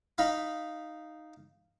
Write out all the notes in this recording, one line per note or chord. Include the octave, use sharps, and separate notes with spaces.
D#4 F5 B5